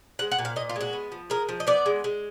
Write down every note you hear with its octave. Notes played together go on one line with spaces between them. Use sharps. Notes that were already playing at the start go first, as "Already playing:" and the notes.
G#3 F#5
F#5
A#2
F5
A#2 D#5
F4
G#3 F#4
B3
F3
G#3 A#4
F3
D#5
B3 D5
G#3
G#3